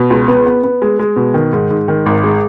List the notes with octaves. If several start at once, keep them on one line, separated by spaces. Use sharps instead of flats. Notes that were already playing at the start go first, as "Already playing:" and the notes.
Already playing: B2
C#2
B3
B3
B3
G#3
G#3
B2
D#3
G#2
G#2
D#3
G#1
G#3